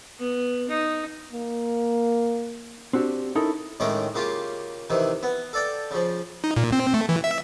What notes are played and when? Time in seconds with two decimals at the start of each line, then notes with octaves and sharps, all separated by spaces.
0.20 B3
0.69 D#4
1.32 A#3
2.93 C4 D4 F#4 G4
3.35 C#4 D#4 E4 A4 A#4
3.80 A2 D#3 G#3 C#4 A#4 D6
4.15 C#3 A#3 F4 G4
4.90 C3 D#3 E3
5.23 B3
5.53 A4 D5 G5
5.91 C#3 F3
6.44 D#4
6.56 A#2
6.72 C4
6.94 A3
7.09 E3
7.24 E5